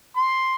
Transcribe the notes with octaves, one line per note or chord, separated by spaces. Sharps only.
C6